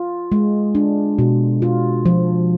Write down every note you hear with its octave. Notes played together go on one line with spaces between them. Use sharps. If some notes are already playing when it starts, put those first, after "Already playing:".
Already playing: F4
G#3
D4
B2
F4
F3